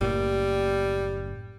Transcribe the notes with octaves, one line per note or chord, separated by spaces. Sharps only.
F#1 A2 G3 A#3